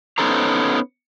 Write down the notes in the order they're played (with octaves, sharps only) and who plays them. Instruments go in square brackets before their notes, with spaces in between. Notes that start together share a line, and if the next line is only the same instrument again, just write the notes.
[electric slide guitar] B3 C#4 D#4 A4 C5 A#5